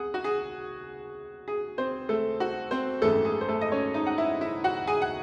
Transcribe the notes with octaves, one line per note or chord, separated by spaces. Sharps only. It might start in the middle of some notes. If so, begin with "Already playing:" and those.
Already playing: C2 C3 G#4 F#5
F#4
G#4
G#4
C4 C5
A3 A4
F#4
C4 C5
G#1 F#2 E3 G#3 A3 A4
G#4
C5
A3 A4
D#5
C#4 C#5
D#4 D#5
F#5
E4 E5
E4 E5
F#4 F#5
G#4 G#5
F#5